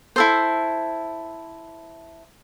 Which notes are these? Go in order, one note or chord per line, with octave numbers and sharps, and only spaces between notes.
E4 A4 C5